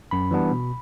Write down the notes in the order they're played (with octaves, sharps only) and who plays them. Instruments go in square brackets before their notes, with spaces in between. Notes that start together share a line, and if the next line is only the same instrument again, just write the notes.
[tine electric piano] F#2 B5
E3 G3 B3 D4
B2